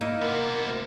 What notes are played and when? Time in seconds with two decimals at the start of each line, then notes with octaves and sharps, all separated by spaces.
0.01 A#3 D#4 E4
0.21 C3 B3 A#4
0.66 D2